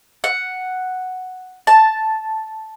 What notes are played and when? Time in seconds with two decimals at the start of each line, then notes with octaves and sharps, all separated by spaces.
0.24 F#5
1.67 A5